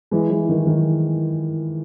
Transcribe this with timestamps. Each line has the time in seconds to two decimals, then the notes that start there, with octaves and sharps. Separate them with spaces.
0.11 E3 G#3
0.30 E3 G#3
0.49 D#3
0.67 D#3